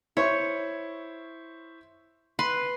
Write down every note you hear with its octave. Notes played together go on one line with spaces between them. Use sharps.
E4 C5 C#5 C#6
B4 C6